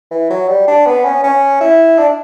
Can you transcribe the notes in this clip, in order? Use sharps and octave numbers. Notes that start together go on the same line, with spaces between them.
E3
F#3
G3
D4
B3
C#4
C#4
E4
D4